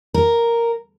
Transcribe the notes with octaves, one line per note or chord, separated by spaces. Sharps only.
A#4